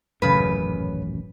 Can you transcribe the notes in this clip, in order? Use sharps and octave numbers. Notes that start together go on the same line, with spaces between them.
D#1 A1 F#2 C#3 B4